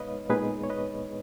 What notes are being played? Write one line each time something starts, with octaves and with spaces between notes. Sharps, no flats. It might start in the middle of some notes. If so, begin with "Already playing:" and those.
Already playing: A#2 G#3 B3 D#4 B4 C#5 D#5 F5
A#2 G#3 B3 D#4 G#4 B4
C#5
B4 D#5